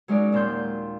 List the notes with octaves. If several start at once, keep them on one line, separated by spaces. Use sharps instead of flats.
F#3 G#3 C#4 D#4 A#4 D5
D#2 A#2 C6 G6